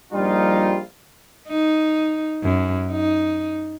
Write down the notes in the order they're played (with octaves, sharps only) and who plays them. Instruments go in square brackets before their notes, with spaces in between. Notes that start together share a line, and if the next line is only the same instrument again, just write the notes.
[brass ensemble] A#1 G3 D#4 F4
[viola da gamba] D#4
F#2
D#4